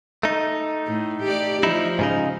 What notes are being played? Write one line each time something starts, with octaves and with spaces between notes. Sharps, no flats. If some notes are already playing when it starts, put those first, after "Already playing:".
A3 D#4
A2
G4 D5
F3 D#4 E4
G#2 C#3 D#4